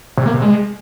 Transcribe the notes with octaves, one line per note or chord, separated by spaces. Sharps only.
C3
A#3
C3
G#3